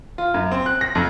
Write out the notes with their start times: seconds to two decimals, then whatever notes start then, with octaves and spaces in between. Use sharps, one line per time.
0.18 F4
0.34 F#2
0.51 C4
0.66 F#6
0.81 A#6
0.95 F2